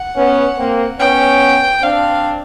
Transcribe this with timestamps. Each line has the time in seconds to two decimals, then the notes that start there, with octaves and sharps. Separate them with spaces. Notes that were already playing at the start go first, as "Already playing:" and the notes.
Already playing: F#5
0.16 B3 C#4
0.58 A#3 C4
0.99 B3 C#4 G5
1.82 C4 D4 F5